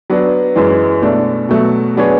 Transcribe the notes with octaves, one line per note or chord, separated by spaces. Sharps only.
F#3 B3 D4
F#2 E3 G#3
B2 A3 D4
B2 F#3 A3
F#3 B3 D4 G#4 C#5